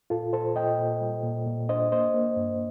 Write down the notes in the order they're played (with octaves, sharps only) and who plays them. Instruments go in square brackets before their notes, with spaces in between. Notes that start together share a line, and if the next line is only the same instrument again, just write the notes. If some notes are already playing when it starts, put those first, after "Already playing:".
[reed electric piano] A#2 F4 A4
A#2 A4 C5
A#2 D#5 G5
A#2
G3
A#2
A#2
D4 C5 D#5
A#3 C5 D#5
A#3
G2